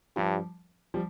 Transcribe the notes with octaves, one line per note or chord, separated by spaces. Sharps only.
G2 F3 G3
F3 G3